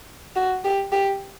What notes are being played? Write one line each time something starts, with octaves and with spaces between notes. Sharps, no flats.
F#4
G4
G4